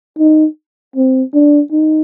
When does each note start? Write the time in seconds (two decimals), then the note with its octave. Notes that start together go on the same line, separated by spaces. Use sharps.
0.19 D#4
0.96 C4
1.34 D4
1.72 D#4